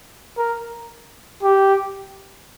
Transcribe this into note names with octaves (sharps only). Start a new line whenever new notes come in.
A#4
G4